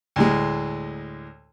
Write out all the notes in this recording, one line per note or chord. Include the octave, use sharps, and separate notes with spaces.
D2 A2 G#3